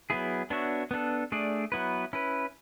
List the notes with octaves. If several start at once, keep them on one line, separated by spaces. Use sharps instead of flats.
F#3 B3 E4 G#4
B3 D4 F#4 C#5 E5
B3 D4 A4
A3 D4 G#4 D5
F#3 B3 E4 B4
C#4 E4 B4